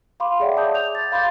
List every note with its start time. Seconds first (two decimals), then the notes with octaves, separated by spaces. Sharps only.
0.20 F5 B5 C6 D6
0.40 G#4 C#5 D5 E5 F#5 G5
0.56 E5 A5 D6 D#6 G6
0.74 G6 F7
0.95 A6
1.12 F5 B5 C6 D6 G6 A6